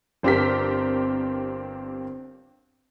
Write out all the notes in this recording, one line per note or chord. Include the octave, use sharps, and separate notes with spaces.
G1 C4 D4 G4 A#4 B6